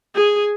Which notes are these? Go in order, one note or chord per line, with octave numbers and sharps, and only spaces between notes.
G#4